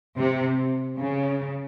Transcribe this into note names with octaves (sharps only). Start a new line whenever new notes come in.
C3
C#3